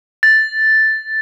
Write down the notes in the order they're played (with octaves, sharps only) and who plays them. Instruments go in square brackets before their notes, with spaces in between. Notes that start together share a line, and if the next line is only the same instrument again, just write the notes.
[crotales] A6